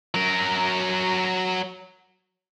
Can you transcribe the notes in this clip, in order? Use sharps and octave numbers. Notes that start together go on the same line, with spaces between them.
F#3 A#4